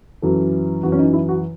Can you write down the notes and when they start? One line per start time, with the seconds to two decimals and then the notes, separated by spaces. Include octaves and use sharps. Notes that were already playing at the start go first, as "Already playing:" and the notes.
0.22 F#2 E3 A4
0.83 F#2 E3 F#4
0.92 C#4
0.99 D#4
1.13 E4
1.29 F#4